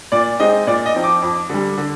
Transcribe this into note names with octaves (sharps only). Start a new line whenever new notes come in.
A#2 D5
G#3 C4 D#4 D#5
A#2 D5
D#5
F3 C4 D#4
D6
F2
D3 G3
D3